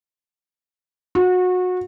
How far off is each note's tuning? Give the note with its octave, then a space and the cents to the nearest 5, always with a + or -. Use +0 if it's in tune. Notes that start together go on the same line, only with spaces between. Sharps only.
F#4 -25